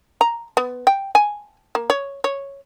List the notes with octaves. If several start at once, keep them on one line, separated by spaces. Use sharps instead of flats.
A#5
B3
G5
G#5
A#3
C#5
C#5